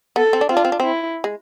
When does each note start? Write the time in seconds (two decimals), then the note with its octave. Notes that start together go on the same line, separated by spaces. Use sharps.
0.16 B3 A4
0.33 C4
0.41 D4
0.49 C4 F4
0.57 D4
0.65 C4
0.72 D4
0.80 C4 E4
1.24 G#3